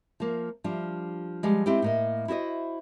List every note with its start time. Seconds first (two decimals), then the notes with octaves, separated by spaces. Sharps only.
0.20 F3 A#3
0.64 F3 G3 D4
1.43 F3 G3 G#3
1.66 G#3 C4 E4 G4 G5
1.82 A2 A#3 D#5
2.28 E4 F#4 C5 D#5